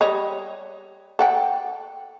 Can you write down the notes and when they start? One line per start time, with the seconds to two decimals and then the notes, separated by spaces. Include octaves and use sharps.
0.01 G3 C#5 D#5
1.19 A4 F#5 G5